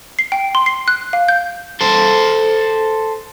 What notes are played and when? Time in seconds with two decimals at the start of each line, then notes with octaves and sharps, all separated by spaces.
0.19 C7
0.32 G5
0.55 C6
0.66 C7
0.88 F#6
1.13 F5
1.28 G6
1.81 A4 C5